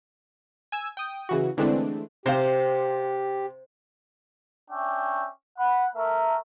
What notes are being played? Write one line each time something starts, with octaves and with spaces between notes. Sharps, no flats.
G#5 E6 G#6
G5 D#6
C#3 E3 F#4
D3 E3 G#3 A3 C4 D4
C3 G4 C5 F5
C#4 D4 E5 G5 C#6 D6
F#5 B5
A3 A#4 E5